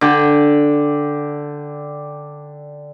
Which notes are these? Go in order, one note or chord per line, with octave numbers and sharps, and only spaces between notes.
D3 D5 G5